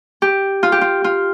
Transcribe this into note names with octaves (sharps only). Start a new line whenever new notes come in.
G4
F4
G4
F4
F4